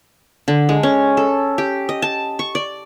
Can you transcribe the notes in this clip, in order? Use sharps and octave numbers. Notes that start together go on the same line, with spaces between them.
D3
G#3
C#4
A4
G4
D#5
A5
C#6
D5